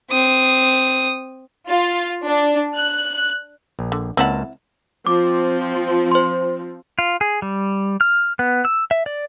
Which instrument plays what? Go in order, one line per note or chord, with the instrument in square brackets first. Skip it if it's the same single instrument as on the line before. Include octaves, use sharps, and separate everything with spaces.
[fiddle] C4 D#6
[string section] F4
D4
F#6
[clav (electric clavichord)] A#1
[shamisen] D3
[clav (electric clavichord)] C#2 A#3 A5 [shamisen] C4 E4 F#5
[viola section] F3 C4 [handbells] D6
[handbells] C5 C6
[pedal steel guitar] F4
G#4
G3
F6
B3
E6
E5
D5